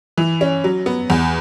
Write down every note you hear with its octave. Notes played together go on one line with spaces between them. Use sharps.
E3
C#4
F#3
B3
E2